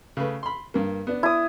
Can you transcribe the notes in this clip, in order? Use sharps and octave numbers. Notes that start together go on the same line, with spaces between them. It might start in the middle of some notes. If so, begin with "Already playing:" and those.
C#3 A3 B4
B5 C6
G2 A#3
B3 D4
E4 D#6